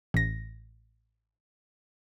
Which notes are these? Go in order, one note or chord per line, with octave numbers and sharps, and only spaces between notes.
A1 A#6